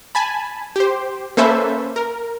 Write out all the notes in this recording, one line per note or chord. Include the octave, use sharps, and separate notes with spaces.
G#5 A5 B5
G4 C5
A#3 C#4 A4 B4 C5 E5
A#4